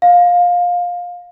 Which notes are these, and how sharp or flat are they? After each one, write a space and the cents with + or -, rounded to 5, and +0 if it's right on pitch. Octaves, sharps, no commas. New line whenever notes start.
F5 +20